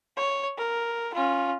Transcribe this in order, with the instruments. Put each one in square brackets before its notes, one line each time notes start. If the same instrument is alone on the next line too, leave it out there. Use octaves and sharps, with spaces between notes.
[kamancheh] C#5
A#4
C#4 F4